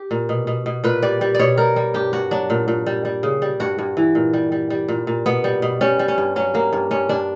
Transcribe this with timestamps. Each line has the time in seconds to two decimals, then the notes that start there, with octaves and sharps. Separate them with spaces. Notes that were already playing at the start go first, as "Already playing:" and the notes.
Already playing: G4
0.11 A#2
0.29 B2
0.47 B2
0.66 B2
0.84 A#2 B4
1.02 G3 D5
1.21 G3
1.35 B2 C#5 D5
1.58 G3 A#4
1.76 G3
1.94 G2 G4
2.13 G2 F#4
2.31 F#3 D4
2.50 A#2
2.68 A#2
2.86 G3
3.05 G3
3.23 C#3
3.42 G3
3.60 G2 F#4
3.78 G2
3.97 E3
4.15 A#2
4.33 G3
4.52 G3
4.70 G3
4.88 A#2
5.07 A#2
5.26 B2 B3
5.44 G3
5.62 B2
5.81 G3 C#4
5.99 G3
6.08 C#4
6.18 G2
6.36 F#3 C#4
6.54 F#3 A#3
6.73 G2
6.91 G2 C#4
7.09 G2 D4